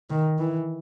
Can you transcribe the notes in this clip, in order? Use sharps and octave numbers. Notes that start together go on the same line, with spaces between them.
D#3
E3